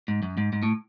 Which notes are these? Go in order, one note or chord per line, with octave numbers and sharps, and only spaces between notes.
G#2
F#2
G#2
G#2
A2